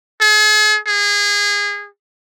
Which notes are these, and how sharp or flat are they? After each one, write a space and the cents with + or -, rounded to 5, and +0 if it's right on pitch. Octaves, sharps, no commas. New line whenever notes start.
G#4 +45
G#4 -25